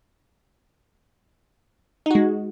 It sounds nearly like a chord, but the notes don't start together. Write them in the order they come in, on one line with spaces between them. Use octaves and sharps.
D#4 F#4 G#3